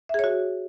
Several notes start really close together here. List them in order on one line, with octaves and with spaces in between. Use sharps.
E5 G#4 C#5 F#4